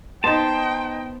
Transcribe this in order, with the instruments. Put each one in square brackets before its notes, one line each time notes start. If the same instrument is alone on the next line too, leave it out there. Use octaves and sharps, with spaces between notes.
[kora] B3 C5 [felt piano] D#4 D#5 C6 [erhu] G5 [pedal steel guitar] A5